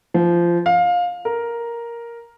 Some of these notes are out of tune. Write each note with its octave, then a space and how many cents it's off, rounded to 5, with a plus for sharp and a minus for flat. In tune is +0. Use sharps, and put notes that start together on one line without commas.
F3 -20
F5 +20
A#4 +5